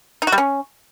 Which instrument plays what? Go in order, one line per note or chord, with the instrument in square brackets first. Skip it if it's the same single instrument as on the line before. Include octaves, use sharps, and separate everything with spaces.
[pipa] D#4
F#4
G3
C#4